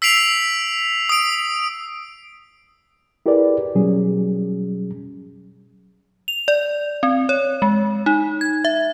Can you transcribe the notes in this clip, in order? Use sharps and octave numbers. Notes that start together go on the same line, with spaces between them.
E6 B6 C7 D7 F7
D#6 D7
E4 G4 G#4 A#4 B4 D5
B2 F#3 G3 C#4 G#4
F7
D5
C4
C#5
G#3
D#4
G#6
E5